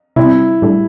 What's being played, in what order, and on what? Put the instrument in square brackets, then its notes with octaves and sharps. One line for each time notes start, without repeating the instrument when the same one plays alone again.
[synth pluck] C3 G3 C4 [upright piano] E4
[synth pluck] A2 G3 D4 A4